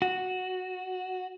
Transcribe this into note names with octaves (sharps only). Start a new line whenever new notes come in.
F#4